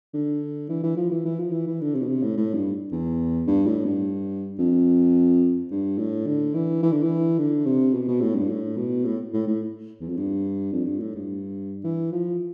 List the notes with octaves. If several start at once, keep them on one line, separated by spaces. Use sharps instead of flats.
D3
E3
E3
F3
E3
E3
F3
E3
E3
D3
C3
B2
C3
A2
A2
G2
E2
G2
A2
G2
F2
G2
A2
D3
E3
E3
D3
E3
D3
C3
B2
B2
A2
G2
A2
B2
A2
A2
A2
E2
F2
G2
F2
G2
A2
G2
E3
F3